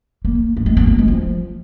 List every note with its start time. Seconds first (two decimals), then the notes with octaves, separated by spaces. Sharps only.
0.25 A#3
0.57 A#3
0.66 G#3
0.77 B3
0.87 A#3
0.98 G#3
1.08 F3